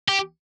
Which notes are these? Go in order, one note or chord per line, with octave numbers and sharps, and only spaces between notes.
G4